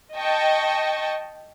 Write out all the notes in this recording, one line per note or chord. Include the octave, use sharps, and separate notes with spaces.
D#5 G5 A5 C#6